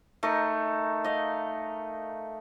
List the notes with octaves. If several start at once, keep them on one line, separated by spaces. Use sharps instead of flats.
A3 D#4 A#4
D#5 F5